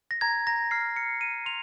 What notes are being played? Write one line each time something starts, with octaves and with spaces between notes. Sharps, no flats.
A#6
A#5 G#6
A#5 A#6
F6 C7
F6 C#7
F6 D#7
C6 F7